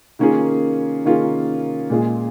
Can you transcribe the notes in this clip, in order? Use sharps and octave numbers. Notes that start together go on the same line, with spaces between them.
D#3 A#3 C#4 F4 G#4
D#3 A#3 C#4 F4 G#4
A#2 G#3 F4 G#4